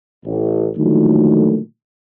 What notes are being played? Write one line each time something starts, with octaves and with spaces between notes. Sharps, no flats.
A1
A#2 D3 D#3 F3 F#3 A3